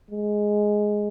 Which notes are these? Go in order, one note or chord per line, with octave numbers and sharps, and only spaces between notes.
G#3